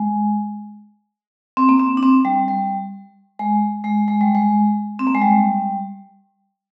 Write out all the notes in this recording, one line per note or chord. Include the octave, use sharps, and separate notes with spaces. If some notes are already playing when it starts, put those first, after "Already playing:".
Already playing: G#3
C4
A#3
C4
D4
C4
G3
G3
G#3
G#3
G#3
G3
G#3
C4
A#3
G#3
G3